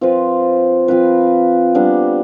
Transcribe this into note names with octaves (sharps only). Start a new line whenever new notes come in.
F3 C4 F4 B4
F3 C4 F4 B4
G3 B3 D4